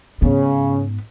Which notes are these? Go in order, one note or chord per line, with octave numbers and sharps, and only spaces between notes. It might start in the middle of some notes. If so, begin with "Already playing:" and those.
G#2 C#3 B3